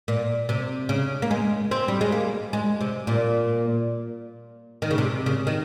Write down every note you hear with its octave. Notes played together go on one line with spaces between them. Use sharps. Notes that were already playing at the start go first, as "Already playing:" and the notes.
A#2
C3
C#3
A#3
G#3
C4
G3
G#3
A#3
G#3
C3
A#2
D#3
C#3
C3
C#3
D#3